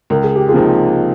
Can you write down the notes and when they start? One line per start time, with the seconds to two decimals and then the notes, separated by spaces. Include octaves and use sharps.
0.10 C#2 A#4
0.23 G#4
0.35 G4
0.48 F4 G#4
0.54 C3 F3 A#3 D#4